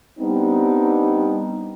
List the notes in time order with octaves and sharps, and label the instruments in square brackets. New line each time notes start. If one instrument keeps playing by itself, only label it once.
[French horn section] G3 B3 C4 D4 D#4